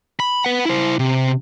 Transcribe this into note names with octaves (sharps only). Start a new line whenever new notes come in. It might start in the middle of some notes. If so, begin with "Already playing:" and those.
B5
B4 F#5
E4 C5
C3